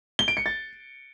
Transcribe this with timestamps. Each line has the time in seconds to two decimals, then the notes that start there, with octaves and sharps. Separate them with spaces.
0.19 G7
0.28 D7
0.37 C#7
0.46 A6